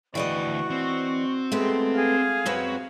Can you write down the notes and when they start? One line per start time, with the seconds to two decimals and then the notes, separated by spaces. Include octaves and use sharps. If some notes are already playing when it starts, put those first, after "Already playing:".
0.15 D2 E3 F#4 D5 D#5 G5 C#6
0.70 C4
1.52 G#3 A3 B3 G4
1.95 G#4 F5
2.46 F#2 C4 F#4 B4